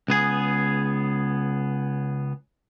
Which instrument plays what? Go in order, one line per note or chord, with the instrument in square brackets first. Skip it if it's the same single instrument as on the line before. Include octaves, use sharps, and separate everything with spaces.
[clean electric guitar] C#2 B3 G#4